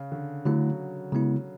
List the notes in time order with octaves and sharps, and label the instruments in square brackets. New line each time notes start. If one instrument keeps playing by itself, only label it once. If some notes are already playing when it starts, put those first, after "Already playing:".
Already playing: [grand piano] C#3
D3
[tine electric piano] D3 A3 E4 [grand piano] F#3
[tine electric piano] C#3 G#3 B3 E4